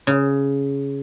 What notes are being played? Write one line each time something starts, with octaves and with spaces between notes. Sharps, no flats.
C#3